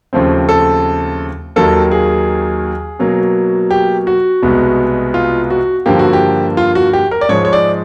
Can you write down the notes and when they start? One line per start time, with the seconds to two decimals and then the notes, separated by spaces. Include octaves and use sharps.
0.13 D#2 C#3 F3 A3 C4
0.49 A4
1.56 D#2 D#3 F#3 A#3 A4
1.92 G#4
2.99 B2 F#3 A#3
3.71 G4
4.07 F#4
4.42 C2 B2 G#3 B3
5.14 F4
5.50 F#4
5.86 G2 D3 F3 A#3 G4
5.99 F#4
6.13 G4
6.57 F4
6.75 F#4
6.93 G4
7.11 A#4
7.21 D5
7.29 G#2 F3 G#3 C#5
7.45 C#5
7.53 D5